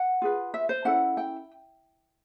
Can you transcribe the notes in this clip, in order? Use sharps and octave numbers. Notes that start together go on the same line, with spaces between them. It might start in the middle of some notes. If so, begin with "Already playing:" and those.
Already playing: F#5
F4 G#4 B4
E5
C5
C#4 E4 A4 F#5
G5